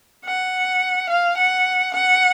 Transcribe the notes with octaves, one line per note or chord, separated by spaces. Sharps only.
F#5
F5
F#5
F#5